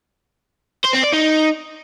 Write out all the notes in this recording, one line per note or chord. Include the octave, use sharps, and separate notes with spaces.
C5
C4
D5
D#4